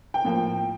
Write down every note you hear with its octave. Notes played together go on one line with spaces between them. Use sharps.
G5
A2 F3 A#3